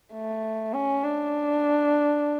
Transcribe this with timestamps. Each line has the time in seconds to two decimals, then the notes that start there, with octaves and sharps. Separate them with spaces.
0.13 A3
0.74 C#4
1.04 D4